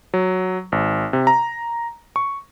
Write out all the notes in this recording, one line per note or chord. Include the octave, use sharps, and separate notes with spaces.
F#3
G#1
C3
A#5
C#6